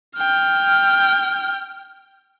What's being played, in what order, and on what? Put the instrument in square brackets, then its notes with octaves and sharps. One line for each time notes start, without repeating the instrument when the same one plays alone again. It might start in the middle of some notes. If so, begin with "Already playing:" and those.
[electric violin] G5 F6